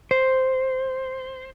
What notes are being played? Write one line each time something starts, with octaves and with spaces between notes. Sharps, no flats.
C5